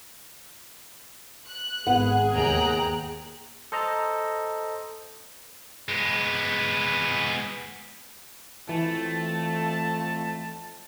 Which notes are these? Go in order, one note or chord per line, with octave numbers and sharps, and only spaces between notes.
F#6
G#1 B3 G#4 F#5
D#2 G5 A#5 F#6
A4 C5 D#5 A#5
G#3 B3
F2 E3 A3 A5